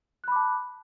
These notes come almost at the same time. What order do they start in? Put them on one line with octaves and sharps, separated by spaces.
F#6 B5 D6 A5